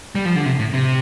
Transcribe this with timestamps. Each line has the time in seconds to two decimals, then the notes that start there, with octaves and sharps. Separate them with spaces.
0.15 G3
0.25 F3
0.36 D3
0.45 C3
0.59 A2
0.74 C3